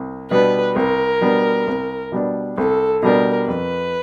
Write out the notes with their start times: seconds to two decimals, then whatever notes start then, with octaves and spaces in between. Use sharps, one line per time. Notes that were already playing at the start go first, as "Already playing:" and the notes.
Already playing: C2
0.31 B2 G3 B3 D4 B4
0.76 C2 A#4
1.21 B2 G3 B3 D4
1.67 C2
2.12 B2 G3 B3 D4
2.58 C2 A4
3.03 B2 G3 B3 D4 A#4
3.48 F2 B4